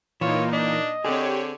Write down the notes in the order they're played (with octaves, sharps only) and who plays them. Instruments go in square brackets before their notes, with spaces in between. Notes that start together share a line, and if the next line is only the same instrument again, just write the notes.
[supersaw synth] A#2 A#3 D#4 [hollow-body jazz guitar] E3 [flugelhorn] F4 [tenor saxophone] C#5
[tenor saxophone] D4 [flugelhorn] D#5
[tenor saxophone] D3 [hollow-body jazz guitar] C4 G#4 [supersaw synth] G4 C#5